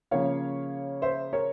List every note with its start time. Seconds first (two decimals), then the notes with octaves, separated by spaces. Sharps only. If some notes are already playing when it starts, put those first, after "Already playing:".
0.11 C#3 F3 A#3 C#5 F5
1.02 C5 E5
1.33 A#4 C#5